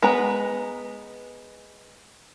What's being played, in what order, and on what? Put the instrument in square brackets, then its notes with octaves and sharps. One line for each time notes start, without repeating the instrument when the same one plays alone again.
[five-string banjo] G#3 B3 B4 A#5